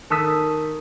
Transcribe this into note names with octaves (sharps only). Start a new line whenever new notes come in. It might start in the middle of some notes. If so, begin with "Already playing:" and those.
D#3 A4 D#6 E6 B6